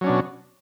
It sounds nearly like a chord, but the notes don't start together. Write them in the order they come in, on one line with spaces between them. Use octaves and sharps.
F#3 C#4 D4 B2